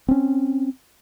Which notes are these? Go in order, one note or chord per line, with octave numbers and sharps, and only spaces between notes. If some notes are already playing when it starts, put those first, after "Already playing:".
C4 C#4